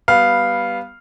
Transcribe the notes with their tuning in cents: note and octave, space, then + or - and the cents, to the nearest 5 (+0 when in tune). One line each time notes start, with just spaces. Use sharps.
G3 +0 B3 -5 F5 -5